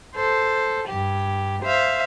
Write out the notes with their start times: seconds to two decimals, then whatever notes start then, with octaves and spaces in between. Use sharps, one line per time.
0.15 A4 C5
0.88 G2 G4
1.63 C5 E5 F5